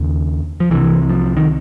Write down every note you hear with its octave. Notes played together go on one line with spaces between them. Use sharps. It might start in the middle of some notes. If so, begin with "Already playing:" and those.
Already playing: D#2 C#3
F3
C2 C3 E3
F3
D#3